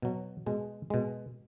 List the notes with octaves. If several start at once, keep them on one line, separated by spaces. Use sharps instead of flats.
B2 F#3
B2 G#3
B2 G#3